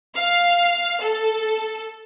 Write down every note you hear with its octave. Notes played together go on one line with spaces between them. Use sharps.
F5
A4